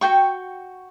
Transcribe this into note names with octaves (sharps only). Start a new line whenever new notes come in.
F#4 G#4 G5 C#6